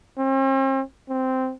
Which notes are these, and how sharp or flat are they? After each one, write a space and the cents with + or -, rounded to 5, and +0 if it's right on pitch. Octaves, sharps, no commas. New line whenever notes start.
C4 +45
C4 -10